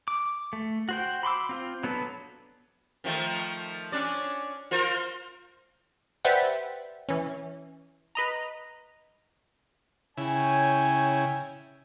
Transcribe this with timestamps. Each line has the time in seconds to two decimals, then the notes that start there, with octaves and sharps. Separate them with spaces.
0.08 D6
0.53 A3
0.89 F#4 C5 G5
1.23 B5 C6 D6 E6
1.49 C4 F4 C5
1.83 F#3 B3 D4 A4 B4
3.04 D#3 F3 A3
3.92 C#4 D4 D5
4.71 F4 A#4 C5
6.25 G4 B4 C5 D5 E5 F#5
7.09 E3 C#4
8.15 B4 D#5 A#5
10.17 C#3 E4 C#5 G5 G#5